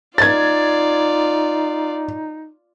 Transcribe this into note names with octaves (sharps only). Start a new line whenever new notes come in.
D#4 F4 D5 G#6 A6